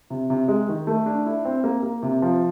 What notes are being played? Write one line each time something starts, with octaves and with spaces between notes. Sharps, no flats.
C3
C3
G#3
D#3
A3
D4
E4
C4
A#3
A#3
C3
F3